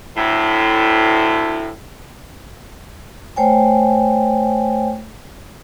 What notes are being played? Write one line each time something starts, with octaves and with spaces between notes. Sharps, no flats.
D2 A2
A3 C5 C#5 G5 G#5